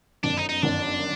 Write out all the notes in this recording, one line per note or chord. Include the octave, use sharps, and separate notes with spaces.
G1 F#2 D#3 D4
D#4
D#4
G1 F#2 D#3 D4